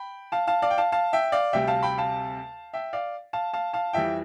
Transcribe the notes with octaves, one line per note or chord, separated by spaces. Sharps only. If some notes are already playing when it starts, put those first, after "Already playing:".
Already playing: G5 B5
F5 A5
F5 A5
D5 F5
G5
F5 A5
F5 A5
E5 G5
D5 F5
D2 C3 G3 E5 G5
F5 A5
G5 B5
F5 A5
E5 G5
D5 F5
F5 A5
F5 A5
F5 A5
F2 E3 G3 E5 G5